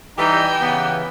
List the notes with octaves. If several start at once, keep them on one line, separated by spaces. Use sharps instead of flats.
E3 G3 D#4 G4 D#5 G5 G#5 E6
C#3 E3 B3